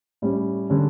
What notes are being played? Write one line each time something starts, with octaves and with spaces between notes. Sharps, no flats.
A2 G3 C#4
D3 G3 C#4